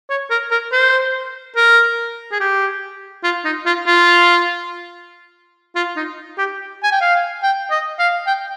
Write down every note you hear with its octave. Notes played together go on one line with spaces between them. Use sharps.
C#5
A#4
A#4
C5
A#4
G#4
G4
F4
D#4
F4
F4
F4
D#4
G4
G#5
G5
F5
G5
D#5
F5
G5